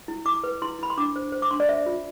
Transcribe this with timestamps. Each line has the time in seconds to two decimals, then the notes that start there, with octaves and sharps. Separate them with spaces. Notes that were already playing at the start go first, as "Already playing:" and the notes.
0.08 E4
0.25 E4 D6
0.44 B4
0.62 E4 C6
0.79 E4 B5
0.90 C6
0.97 D4 D6
1.16 C5
1.32 C5
1.42 D6
1.51 D4 C6
1.60 D5
1.69 C5 E5
1.86 F4